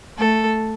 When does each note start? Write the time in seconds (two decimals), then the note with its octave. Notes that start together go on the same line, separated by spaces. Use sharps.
0.17 A3 A4